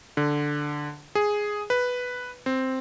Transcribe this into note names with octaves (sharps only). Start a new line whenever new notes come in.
D3
G#4
B4
C4